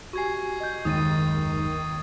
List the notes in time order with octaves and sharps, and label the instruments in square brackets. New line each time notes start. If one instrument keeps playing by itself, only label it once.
[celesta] F#4 G4 G#5 [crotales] C#6 G#6 C7
[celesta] D#5 G6
[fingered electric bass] F#1 D#2 G#2 [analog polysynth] D#3 [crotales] D#6 A6 D#7